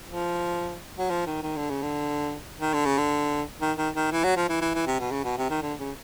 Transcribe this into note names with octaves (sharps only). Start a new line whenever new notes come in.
F3
F#3
F3
D#3
D#3
D3
C#3
D3
D#3
D3
C#3
D3
D#3
D#3
D#3
E3
F#3
F3
E3
E3
E3
C3
B2
C#3
B2
C3
D#3
D3
C#3